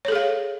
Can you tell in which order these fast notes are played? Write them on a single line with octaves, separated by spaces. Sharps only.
C#5 A4 G#4 F5